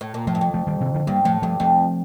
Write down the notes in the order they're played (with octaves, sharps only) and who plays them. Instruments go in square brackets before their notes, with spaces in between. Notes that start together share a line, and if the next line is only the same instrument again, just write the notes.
[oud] A2
A#2
[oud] A2 [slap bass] F3 A3
[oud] G2
F2
[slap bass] F3 A3
D#3 G3
C3 D#3
D3 F3
[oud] G2 [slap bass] G3 A#3
[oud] A2 [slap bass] F3 A3
[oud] G2 [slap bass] F3 A3
[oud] F2 [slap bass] F3 A3